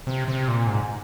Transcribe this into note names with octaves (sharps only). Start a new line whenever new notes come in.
C3
C3
A#2
G#2